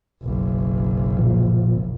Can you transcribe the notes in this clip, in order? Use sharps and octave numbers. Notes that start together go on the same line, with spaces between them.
F#1 B1
A#2 F3